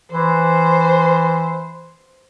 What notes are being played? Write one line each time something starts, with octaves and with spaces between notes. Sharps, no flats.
E3 C5